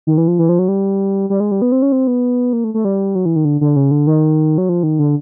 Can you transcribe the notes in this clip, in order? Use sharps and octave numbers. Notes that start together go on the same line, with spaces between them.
D#3
E3
F3
E3
F3
F#3
G3
G3
G#3
G3
B3
C4
C#4
C4
B3
A#3
A3
A3
G3
F#3
E3
D#3
D3
D3
C#3
D3
D#3
F#3
F3
D#3
D3